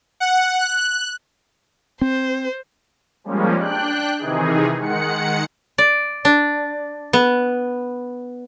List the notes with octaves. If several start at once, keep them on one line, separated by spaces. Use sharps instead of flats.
F#5
F#6
C4 C5
F3 G3 G#3 A#3 C#4
D4 G5 F#6
C3 D#3 E3 D#4 G#4
D#3 G#3 F#5 C#7
D5
D4
B3